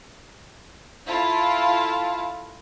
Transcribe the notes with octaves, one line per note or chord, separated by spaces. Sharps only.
E4 F4 A4 F5 A5